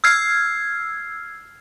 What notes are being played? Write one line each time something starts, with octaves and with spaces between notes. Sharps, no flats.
E6 F6 G#6 C7